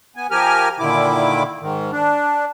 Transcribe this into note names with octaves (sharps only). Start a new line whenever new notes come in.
B3 G#5
F3 G4 A#4 G#5 F6
A#2 D3 D#3 E4 D6
G#2 D#3
D4